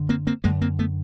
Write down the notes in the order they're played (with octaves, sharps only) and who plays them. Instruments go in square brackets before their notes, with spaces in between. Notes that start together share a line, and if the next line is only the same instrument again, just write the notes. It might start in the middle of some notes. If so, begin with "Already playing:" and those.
Already playing: [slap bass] F#2 D3
A#3 C4
A#3 C4
F#2 D3 G#3 A#3
A#3 C4
A3 B3